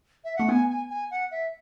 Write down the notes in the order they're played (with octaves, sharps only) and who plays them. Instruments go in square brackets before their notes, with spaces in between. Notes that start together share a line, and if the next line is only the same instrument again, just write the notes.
[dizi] E5
[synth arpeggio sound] A3 [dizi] F#5
[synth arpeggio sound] B3 [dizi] G#5
[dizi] G#5
G#5
F#5
E5